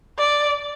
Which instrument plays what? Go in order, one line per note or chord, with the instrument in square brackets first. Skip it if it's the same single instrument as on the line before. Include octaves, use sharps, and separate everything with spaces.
[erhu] D5